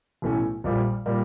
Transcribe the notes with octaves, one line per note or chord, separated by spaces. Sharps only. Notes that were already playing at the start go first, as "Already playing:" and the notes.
B1 A2 E3 A3 C#4
A#1 A#2 G3 A#3
A#2 G3 A#3